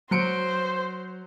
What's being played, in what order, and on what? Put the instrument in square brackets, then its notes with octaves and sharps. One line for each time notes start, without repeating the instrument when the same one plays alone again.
[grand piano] F#3 C#7 D7 [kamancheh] C5